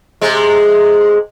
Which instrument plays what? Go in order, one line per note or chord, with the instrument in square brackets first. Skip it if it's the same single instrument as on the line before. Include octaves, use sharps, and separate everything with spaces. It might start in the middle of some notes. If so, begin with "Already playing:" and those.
[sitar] C3 G#3